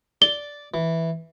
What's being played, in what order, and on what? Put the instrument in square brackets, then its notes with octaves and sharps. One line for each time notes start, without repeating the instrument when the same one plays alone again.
[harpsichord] D5 [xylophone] G7
[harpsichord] E3